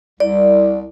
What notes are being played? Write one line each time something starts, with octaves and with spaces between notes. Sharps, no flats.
C2 D5